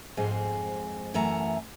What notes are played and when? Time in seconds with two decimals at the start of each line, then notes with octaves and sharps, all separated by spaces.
0.17 F2 G#2 G#3 C4
1.14 F#2 E3 A3 F#5 A#5